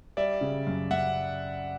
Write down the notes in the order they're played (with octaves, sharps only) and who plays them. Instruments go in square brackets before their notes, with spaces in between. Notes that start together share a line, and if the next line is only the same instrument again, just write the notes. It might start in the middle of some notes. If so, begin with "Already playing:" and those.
[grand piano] G3 [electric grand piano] D5 E5
[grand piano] C#3
F#2
[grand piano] F#2 [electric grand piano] E5 F#5